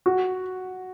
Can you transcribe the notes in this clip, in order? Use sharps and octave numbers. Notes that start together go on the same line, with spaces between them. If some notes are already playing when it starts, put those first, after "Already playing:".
F#4